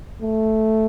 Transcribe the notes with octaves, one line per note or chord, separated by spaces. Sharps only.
A3